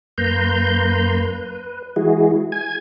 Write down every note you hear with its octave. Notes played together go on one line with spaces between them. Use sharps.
F#2 A#3 B4 A#5 C6 G6
B4
E3 G#3 E4 F#4 G#4
G#5 G#6